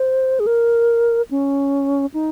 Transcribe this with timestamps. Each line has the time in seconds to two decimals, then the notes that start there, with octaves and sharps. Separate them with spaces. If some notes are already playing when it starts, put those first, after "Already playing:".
Already playing: C5
0.40 G#4
0.47 A#4
1.31 C#4
2.14 D#4